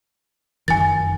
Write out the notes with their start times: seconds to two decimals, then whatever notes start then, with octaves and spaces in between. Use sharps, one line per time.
0.68 F1 F#2 D#3 G#5 A6